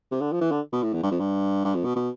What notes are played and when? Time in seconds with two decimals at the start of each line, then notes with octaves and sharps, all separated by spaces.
0.12 C3
0.21 D3
0.32 F3
0.41 E3
0.51 D3
0.73 B2
0.83 A2
0.94 E2
1.03 G2
1.11 F2
1.20 G2
1.65 G2
1.75 F2
1.85 B2
1.96 B2